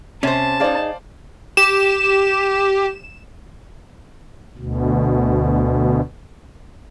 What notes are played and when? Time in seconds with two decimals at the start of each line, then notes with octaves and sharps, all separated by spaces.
0.23 C3 C#4 C5 A5
0.60 D#4 G#4 C5 D5 F5
1.57 G4 E7
4.58 D2 B2